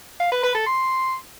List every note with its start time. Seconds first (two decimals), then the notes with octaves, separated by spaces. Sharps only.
0.20 F5
0.32 B4
0.43 B4
0.55 A4
0.66 C6